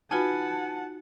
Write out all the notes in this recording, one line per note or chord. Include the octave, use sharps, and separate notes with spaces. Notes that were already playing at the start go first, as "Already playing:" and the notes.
D#4 F4 F#4 B4 F#5 G#5 A5